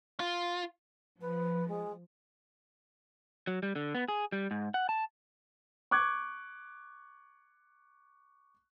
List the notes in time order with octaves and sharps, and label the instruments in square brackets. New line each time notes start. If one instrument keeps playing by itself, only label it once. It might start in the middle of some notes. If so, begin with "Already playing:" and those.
[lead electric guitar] F4
[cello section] F3 [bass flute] B4
[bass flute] G#3
[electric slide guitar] F#3
G3
D3
B3
G#4
G3
G#2
F#5
A5
[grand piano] C#6 D6 F#6 G#6